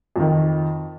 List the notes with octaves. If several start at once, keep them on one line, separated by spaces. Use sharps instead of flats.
F2 D#3